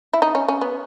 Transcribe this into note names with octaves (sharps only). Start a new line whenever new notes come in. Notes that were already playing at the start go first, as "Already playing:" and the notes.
E4
D#4
C#4
C#4
B3